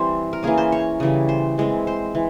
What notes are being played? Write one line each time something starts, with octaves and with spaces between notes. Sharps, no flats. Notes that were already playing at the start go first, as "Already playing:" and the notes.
Already playing: E3 G3 C4 C5
A#4
E3 A#3 C#4 G#4
C5
C#5
C#3 E3 G3
C5
E3 G#3 C4
C5
E3